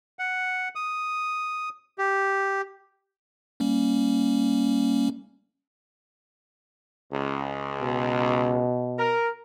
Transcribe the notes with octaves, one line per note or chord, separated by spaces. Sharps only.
F#5
D#6
G4
G3 A#3 C#4
C#2
B2
A#4